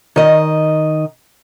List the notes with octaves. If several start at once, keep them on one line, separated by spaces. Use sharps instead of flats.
D#3 D#5